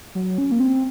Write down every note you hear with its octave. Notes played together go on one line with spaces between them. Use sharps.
F#3
C#4
A#3
C4